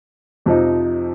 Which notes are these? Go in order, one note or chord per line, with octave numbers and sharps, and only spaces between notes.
F2 C3 F3 D#4